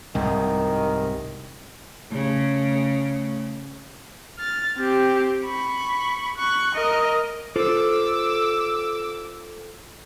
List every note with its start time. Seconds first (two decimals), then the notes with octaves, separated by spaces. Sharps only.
0.15 C2 G#2 D#3
2.12 C#3 A3
4.38 F6 A6
4.77 C4 G4
5.45 B5 C#6
6.37 C#6 F#6
6.75 A#4 D#5
7.56 F4 A4 C5 D6 E6